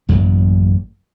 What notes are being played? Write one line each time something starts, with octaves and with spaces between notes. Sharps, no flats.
A1 F#2 C#3 A#3